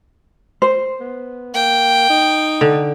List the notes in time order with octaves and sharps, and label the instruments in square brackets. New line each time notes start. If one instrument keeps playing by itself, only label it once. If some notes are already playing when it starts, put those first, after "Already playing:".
[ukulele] C5
[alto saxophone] B3
[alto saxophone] A#3 [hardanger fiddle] G5
[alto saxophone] D#4
[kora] D3